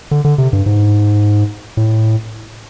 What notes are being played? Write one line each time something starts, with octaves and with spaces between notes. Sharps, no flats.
D3
D3
C3
G2
G#2
A2